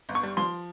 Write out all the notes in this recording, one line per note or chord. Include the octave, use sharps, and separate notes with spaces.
G1
C#6
G3
F3 C6